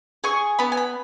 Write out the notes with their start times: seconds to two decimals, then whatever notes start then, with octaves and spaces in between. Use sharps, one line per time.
0.24 G#4 C#6
0.59 B3 B5
0.72 G#5
0.77 B5